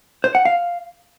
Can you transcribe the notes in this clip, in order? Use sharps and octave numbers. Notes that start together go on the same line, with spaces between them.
C5
F#5
F5